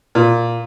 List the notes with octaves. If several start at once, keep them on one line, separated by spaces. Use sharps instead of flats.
A#2